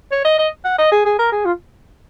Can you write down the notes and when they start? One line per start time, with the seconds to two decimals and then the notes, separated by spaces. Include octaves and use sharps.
0.11 C#5
0.25 D#5
0.39 D#5
0.65 F#5
0.78 D#5
0.92 G#4
1.05 G#4
1.19 A#4
1.32 G#4
1.45 F4